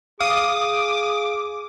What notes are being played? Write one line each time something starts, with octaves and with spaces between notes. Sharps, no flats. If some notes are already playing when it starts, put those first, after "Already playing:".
G#4 F5 D6 D#6